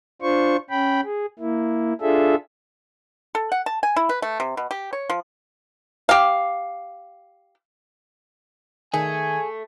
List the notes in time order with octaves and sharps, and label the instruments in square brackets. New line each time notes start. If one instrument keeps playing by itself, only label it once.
[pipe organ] D4 F4 C5 C#6
C#4 G5 B5
G#4
A#3 E4
D4 F4 G#4 A4 E5
[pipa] A4
F#5
A5
G#5
E4
B4
A3
C3
B2
G4
C#5
F3
G4 F5
[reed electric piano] D#3 [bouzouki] A3 [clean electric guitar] G#4 [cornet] G#5